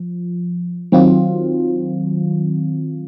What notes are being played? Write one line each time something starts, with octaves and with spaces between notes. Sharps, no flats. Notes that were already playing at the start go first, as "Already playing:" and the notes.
Already playing: F3
D#3 F#3 C4 F4